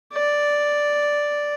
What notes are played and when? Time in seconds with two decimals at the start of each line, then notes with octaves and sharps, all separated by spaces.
0.14 D5